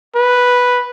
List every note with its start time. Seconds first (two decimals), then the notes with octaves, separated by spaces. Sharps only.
0.15 B4